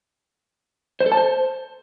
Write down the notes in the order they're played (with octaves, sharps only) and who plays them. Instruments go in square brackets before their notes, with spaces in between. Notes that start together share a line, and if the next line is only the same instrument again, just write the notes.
[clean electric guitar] C5
A4
A5
C5